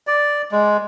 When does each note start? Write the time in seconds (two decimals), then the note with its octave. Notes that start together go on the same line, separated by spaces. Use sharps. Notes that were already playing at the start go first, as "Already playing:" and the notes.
0.07 D5
0.52 G#3